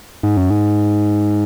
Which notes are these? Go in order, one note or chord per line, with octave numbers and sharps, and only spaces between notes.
G#2
F#2
G#2